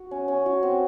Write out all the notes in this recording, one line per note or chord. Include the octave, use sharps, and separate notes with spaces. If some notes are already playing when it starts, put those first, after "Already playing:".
Already playing: F#4
C#4
C#4
F#4
C4